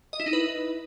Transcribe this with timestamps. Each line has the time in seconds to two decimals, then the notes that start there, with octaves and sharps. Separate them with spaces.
0.13 D#5
0.20 E4
0.26 D#4
0.33 B4